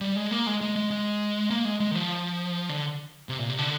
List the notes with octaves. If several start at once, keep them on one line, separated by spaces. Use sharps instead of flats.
G3
G#3
A#3
G#3
G#3
G#3
G#3
A#3
G#3
G#3
D#3
F3
D3
C3
A#2
C3
D3